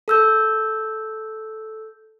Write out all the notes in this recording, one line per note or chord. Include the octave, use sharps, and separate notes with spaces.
A4 E6 G6